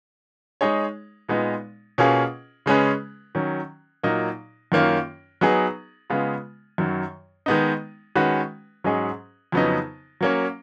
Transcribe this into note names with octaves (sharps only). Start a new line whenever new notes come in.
G#3 D#4 G#4 C#5
A#2 G#3 B3 D#4
B2 A#3 C#4 F4 G#4
C#3 G#3 C#4 G#4 B4
D#3 F#3 C#4
A#2 F#3 A#3 D#4
F#2 D#3 A#3 C#4 F4
F#3 B3 D#4 G#4
C#3 G#3 B3 F4
F#2 D#3 F#3
D#3 G#3 B3 D#4
D#3 G#3 C#4 F#4 B4
G#2 F#3 C#4 G#4 D#5
F2 C#3 F#3 B3 D#4
F#3 A#3 C#4